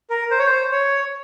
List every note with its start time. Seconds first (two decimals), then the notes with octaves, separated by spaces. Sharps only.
0.10 A#4
0.31 C5
0.39 C#5
0.46 C5
0.71 C#5